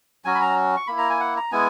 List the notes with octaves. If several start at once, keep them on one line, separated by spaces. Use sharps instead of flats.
F#3 C#4 F#4 G#5
B5
A#5
C#6
A#3 E4 B5
A#5
G#5
F#5
A#5
G#3 B3 E4 G#5